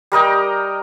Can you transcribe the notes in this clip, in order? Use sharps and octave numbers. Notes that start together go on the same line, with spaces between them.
G3 A#4 D#5 G5